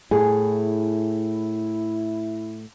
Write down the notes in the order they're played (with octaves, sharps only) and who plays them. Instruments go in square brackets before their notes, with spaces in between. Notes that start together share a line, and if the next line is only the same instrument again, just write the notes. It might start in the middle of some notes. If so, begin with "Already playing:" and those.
[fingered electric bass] A2 [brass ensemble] E4 [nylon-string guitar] G#4